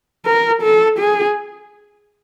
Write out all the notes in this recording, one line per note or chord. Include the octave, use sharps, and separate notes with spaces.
A#4
A4
G#4